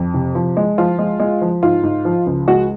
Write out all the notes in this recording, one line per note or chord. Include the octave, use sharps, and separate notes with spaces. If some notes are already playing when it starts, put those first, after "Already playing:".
Already playing: F2
C3
F3
G#3
F3 F4
G#3
G#3
F3
G#2 F4
G#2
F3
C#2
G#3 F#4